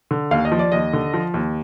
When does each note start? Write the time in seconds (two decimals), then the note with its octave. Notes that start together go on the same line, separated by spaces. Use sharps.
0.11 D3
0.31 D#2 F5
0.45 D#5
0.52 F3
0.59 D5
0.72 D#2 D#5
0.93 D3
1.14 F3
1.34 D#2